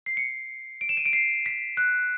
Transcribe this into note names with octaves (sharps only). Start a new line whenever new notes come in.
C7
C#7
D7
E7
D#7
D7
C7
B6
F#6